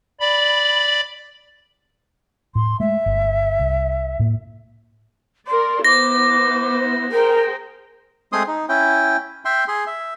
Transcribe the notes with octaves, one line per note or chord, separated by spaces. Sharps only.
D5 B5
A2 C6
G#3 A3 E5
G1
C2
A2 A#3
A#4 D5 C6
B3 E4 C5 D6 A#6
G#4 A#4 C5 G5
G#3 A3 C4 G#4 C6 D#6
D#4
C#4 E4 G5
E5 G5 C6
G#4 C6
E5